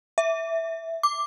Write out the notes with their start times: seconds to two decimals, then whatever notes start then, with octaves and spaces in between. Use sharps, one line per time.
0.18 E5
1.03 D6